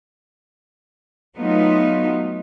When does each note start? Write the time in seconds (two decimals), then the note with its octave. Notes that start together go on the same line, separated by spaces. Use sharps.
1.38 F#3 A3 B3 D#4 F4